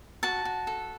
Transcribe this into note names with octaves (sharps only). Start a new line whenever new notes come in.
F#4 A5
F#4
A4